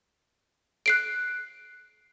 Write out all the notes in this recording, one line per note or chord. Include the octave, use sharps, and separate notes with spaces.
F#6 C7 D7